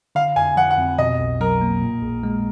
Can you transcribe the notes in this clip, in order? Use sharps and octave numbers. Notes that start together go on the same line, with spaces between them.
D3 F5
F2 G#5
F3 F#5
F#5
F2
B2 D#5
B1
F#3 A#4
A#3
A#2
A#1
G#3